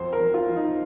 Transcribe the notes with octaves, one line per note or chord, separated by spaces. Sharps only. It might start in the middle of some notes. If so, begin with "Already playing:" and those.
Already playing: F2 C5
A#4
F3
F4
F3
D#4